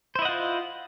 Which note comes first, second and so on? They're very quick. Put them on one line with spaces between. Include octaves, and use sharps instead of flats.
C5 E4 D#5 F#5 F4